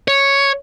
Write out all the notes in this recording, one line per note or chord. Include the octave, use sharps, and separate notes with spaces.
C#5